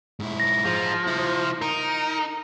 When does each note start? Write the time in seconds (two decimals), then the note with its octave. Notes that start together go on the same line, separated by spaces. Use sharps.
0.20 G#2 E4
0.40 A#6
0.65 F3 G#4 C5
1.07 E4 C5
1.62 D#4 A#4